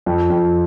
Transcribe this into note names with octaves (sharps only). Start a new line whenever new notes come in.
F2
F2